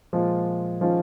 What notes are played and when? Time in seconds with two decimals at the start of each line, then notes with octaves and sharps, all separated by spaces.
0.13 A#2 F3 G#3 F4
0.81 D#3 F3 G#3 C#4 F4